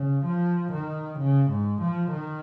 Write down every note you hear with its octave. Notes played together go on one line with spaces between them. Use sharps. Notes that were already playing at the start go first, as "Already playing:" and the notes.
Already playing: C#3
F3
D#3
C#3
G#2
F3
D#3